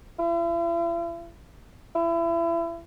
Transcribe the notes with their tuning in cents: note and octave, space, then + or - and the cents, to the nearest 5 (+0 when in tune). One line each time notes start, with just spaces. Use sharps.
E4 +45
E4 +30